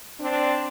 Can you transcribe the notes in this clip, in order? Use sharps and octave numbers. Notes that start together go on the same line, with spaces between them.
C4 D4